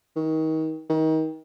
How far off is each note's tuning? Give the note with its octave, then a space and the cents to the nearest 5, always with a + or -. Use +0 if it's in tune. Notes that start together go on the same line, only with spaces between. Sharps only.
D#3 +30
D#3 +30